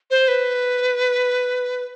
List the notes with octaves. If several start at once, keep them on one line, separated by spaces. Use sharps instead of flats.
C5
B4